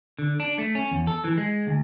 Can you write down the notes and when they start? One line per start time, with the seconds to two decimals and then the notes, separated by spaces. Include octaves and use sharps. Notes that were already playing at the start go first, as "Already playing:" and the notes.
0.19 D3
0.40 D4
0.58 A3
0.75 C#4
0.91 E2
1.07 A4
1.24 E3
1.38 G#3
1.67 D2